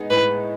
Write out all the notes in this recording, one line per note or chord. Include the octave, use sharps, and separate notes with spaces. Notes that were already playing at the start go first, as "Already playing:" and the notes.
Already playing: G#3 B3 D#4
A2 B4